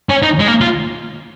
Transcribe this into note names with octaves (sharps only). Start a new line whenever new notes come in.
C#4
D#4
G#3
A#3
F4